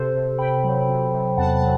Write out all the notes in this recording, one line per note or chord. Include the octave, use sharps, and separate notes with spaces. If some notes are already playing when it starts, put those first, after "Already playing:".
Already playing: C3 A4 C5
C3
C3 G5 B5
F#3
C3
C3
E2 F#5 A5
F#5 A5
F#3